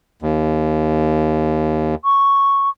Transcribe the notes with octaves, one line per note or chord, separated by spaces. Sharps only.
D#2
C#6